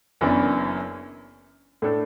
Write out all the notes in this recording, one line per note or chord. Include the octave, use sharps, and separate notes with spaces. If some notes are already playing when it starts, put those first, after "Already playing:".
F#1 F#2 E3 B3 D4
A2 A3 D4 A4